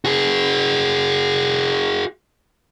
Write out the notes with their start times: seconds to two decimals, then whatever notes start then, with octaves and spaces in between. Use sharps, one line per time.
0.05 F#4 G#4